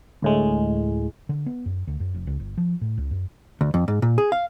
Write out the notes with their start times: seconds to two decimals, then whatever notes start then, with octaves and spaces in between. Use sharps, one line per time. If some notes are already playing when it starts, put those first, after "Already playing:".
0.22 D2 A2 G#3
1.29 D3
1.46 B3
1.66 F#2
1.87 D2
2.00 F#2
2.14 F1
2.27 C#2
2.40 G1
2.58 F3
2.81 A2
2.98 C#2
3.11 F#2
3.61 D2
3.74 F2
3.88 G#2
4.02 A#2
4.18 G#4
4.32 F5